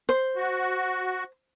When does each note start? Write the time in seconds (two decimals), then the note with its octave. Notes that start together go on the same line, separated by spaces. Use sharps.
0.09 C5
0.36 F#4